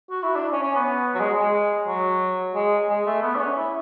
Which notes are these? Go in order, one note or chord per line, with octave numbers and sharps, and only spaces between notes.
F#4
E4
D4
C#4
C#4
B3
F#3
G#3
G#3
F#3
G#3
G#3
A3
B3
D4
C#4
E4